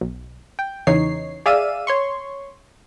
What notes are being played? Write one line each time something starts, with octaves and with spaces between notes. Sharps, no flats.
B1
G5
E2 C#3 E3 D#4 C#5 C7
G#4 D5 E5 F5 E6 D#7
C#5 C6 C#6